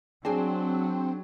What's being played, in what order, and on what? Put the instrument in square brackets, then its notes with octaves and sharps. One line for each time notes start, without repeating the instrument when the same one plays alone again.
[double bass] F#3 [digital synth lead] C4 [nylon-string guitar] D4 G#4 G#5